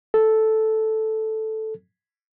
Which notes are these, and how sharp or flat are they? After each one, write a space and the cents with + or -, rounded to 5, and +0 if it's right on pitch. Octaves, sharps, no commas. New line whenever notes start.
A4 -5